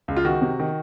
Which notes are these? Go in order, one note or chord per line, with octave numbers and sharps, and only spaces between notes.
C#2
F4
D#3 F#4
C3
D#3